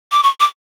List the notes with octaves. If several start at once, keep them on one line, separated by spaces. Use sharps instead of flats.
D6
C#6
D6